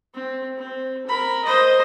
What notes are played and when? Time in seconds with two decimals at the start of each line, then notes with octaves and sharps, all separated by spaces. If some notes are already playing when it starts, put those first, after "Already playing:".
0.14 C4
0.57 C4
1.06 A#4 B5
1.45 C5 D#5